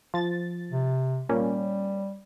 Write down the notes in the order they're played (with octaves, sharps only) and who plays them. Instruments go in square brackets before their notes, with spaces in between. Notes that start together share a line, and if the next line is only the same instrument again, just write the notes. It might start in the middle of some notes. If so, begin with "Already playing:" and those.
[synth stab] F3 A6
[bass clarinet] C3
[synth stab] A#2 A#3 C#4 [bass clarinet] G3